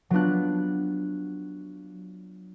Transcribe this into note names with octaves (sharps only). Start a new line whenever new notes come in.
F#3 B3 D4 F4 F#6